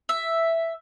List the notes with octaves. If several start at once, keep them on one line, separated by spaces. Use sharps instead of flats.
E5